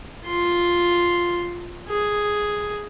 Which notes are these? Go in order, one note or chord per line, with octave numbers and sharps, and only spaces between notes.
F4 C6
G#4